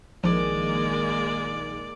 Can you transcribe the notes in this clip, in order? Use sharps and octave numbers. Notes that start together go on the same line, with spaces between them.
A#1 D#3 F3 G#3 A#3 D5